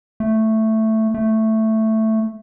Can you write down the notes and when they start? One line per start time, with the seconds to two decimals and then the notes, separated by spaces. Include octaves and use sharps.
0.20 A3
1.14 A3